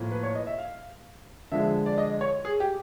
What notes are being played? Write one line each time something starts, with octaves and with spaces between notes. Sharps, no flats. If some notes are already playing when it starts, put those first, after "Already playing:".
Already playing: A2 F3 A#3
B4
C#5
D#5
E5
F5
D3 F3 G#3 E5
D5
D#5
C#5
G#4
G4